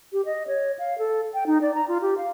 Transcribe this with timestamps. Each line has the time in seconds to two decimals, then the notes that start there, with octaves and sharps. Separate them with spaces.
0.13 G4
0.26 D#5
0.47 C#5
0.79 F5
0.98 A4
1.34 G5
1.47 D#4
1.62 D5
1.75 A#5
1.88 F4
2.02 G4
2.18 F5